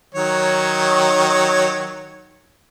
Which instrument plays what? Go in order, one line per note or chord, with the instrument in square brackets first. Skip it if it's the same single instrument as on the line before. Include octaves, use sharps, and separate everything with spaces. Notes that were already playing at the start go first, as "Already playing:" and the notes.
[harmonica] D#3 F#3 C#5